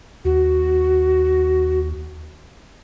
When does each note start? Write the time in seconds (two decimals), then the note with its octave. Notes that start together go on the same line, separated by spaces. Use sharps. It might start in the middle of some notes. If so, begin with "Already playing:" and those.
0.25 D#2 F#4